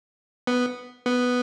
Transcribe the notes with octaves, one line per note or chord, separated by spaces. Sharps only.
B3
B3